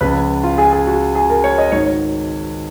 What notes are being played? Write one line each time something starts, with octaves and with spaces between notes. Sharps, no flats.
C#2 C#3 F3 B4
F4
G#4
G#4
F#4
G#4
A#4
C#5
D#5
G#1 G#2 D#3 C#5